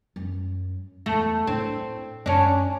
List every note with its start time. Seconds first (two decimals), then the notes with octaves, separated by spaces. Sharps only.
0.16 F#2
1.06 E2 A3
1.47 A2 C4 D4
2.26 F#2 C#4 D4